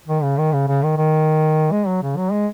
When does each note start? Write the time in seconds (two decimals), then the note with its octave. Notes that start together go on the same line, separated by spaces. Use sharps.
0.08 D#3
0.23 C#3
0.38 D#3
0.53 C#3
0.68 C#3
0.83 D#3
0.97 D#3
1.72 G#3
1.87 F#3
2.03 C#3
2.17 F#3
2.32 G#3